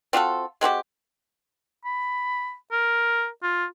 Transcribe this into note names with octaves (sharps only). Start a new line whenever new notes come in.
C4 F4 F#4 A4
G#3 C4 F#4 G4
B5
A#4
F4